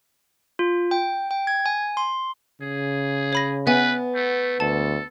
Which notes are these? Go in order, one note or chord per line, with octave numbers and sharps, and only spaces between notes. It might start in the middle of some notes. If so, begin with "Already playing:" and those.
F4
G5
G5
G#6
G#5
C6
C#3 G#4
C#5 B5 A#6
B3 B4 E5 F#5 G#5
A3
D2 A4 A5